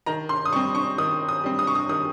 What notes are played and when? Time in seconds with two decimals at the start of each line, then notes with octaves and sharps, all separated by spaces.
0.06 D#3 A#5
0.29 C6
0.46 D#6
0.52 G3 C#6
0.56 C4
0.75 C#6
0.98 D#3 D#6
1.29 D#6
1.44 G3 C4
1.59 D#6
1.67 C#6
1.75 D#6
1.89 D#3 D#6